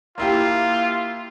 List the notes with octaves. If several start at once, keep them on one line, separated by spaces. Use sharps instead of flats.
A#3 E4 F4 G4